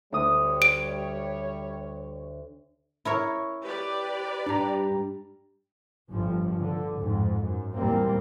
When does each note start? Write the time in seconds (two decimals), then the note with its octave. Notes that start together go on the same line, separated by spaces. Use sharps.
0.12 D2 G3 C#5 D#6
0.62 D7
3.05 E4 A#4 C#5
3.64 G4 B4 D5
4.46 G2 G3 D4 A#5
6.10 G1 G2 F3
6.59 D3
6.99 F2 G#2
7.44 F#2
7.78 E2 A#2 G3 A#3 C4